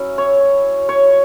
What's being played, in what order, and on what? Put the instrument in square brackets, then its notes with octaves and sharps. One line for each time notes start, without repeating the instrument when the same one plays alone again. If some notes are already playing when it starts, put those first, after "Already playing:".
Already playing: [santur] F#3 C#4 E4
C#5
C#5